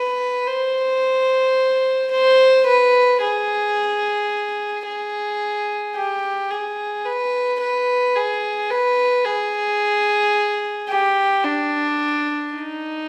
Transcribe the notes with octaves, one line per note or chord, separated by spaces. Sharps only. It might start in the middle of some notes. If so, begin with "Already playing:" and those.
Already playing: B4
C5
C5
B4
G#4
G#4
G4
G#4
B4
B4
G#4
B4
G#4
G4
D4
D#4